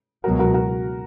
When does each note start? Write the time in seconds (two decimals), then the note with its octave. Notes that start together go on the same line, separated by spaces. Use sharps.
0.24 C#2 B2 F#3 F#4 A#4
0.39 F#4 A#4
0.54 F#4 A#4